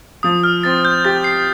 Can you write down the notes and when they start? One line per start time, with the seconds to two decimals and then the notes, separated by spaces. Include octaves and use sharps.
0.23 F3 D#6
0.44 F6
0.63 C4 A6
0.85 G6
1.05 G4 A6
1.24 C7